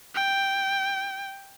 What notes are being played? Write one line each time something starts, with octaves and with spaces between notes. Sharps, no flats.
G5